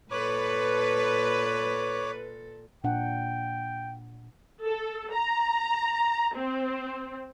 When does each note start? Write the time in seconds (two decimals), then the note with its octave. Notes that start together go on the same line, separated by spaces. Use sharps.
0.11 A#2 A4 B4 C#5 D6
2.84 A#2 D4 F#5 G5
4.63 A4
5.12 A#5
6.35 C4